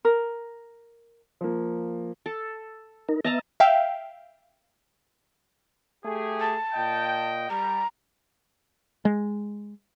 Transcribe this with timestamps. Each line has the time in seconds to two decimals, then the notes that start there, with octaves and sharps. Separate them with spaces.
0.05 A#4
1.41 F3 A#3
2.26 A4
3.09 D#4 A#4
3.24 B3 D#5 E5 A5 A#5
3.60 E5 F5 G5
6.04 A3 G4 G#4
6.40 A5
6.73 A#2 D#5 G5
7.50 G3 A#5
9.05 G#3